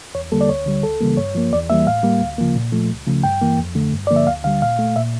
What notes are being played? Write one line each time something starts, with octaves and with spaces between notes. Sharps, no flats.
E2 C#5
D3 G3 A#3 A4
D5
D2 C#5
D3 G3
C#2 A4
C#3 E3 G3 A#3
G2 C#5
F3 A#3
E2 D5
E3 G3 A#3 E5
A2 F5
G3 A#3
D2
C#3 F3 A#3
A#2
F3 A3
C#2
C#3 F3 A3
G2 G5
E3 A#3
F2
D3 A3
G2
D3 F3 A#3 D5
E5
D2 F5
D3 G3 F5
A#2 F5
A3
A#2 E5